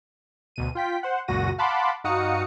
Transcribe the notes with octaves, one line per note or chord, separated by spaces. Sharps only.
D2 B2 D#7
F4 G5 B6
C5 F#5
C#2 F#2 A#2 F#4 A#6 D#7
F5 F#5 A5 B5 C6 D6
G2 D#4 F#4 F5 D#6 C#7